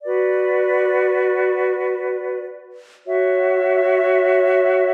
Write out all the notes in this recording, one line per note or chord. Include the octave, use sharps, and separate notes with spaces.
F#4 B4 D5
F#4 C#5 E5